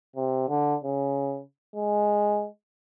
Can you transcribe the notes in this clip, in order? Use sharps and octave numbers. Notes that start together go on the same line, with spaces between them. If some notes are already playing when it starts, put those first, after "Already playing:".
C3
D3
C#3
G#3